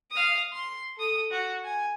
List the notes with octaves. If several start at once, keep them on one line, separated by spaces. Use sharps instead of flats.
F5 D#6
C6
A4 D#6
F#4
G#5